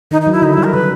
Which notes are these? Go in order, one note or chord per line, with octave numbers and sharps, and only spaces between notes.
D#3 D#4
D#4
F#3
E4
D3 D#4
G3 E4
A#4
C#3 B4